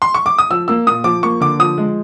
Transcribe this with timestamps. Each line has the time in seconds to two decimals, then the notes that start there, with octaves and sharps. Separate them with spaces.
0.02 C6
0.14 C#6
0.26 D6
0.38 D#6
0.51 F3 E6
0.68 A#3 E6
0.87 A#2 D#6
1.04 F3 D6
1.23 A#3 C#6
1.41 D3 D6
1.59 F3 D#6
1.78 G#3